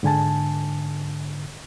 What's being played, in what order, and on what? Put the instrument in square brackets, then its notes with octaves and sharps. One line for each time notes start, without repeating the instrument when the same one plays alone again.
[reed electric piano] G#2 D3 G#5 A5